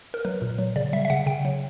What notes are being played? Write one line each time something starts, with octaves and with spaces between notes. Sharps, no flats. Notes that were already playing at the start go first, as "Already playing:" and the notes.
A#4
F#3 B4
A#2
F#3
C#3 D5
G3 E5
E5
C#3 F#5
C#3 G5
F#3